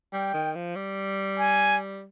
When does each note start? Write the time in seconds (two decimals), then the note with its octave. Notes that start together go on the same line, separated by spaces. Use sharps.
0.13 G3 G5
0.34 D#3
0.56 F3
0.76 G3
1.39 G#5